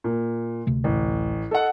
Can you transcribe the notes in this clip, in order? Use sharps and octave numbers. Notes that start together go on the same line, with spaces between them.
A#2
D2 C3 A3
A1
A4 D#5 F#5